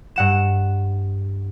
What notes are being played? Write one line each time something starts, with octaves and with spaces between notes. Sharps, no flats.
G2 F#5 E7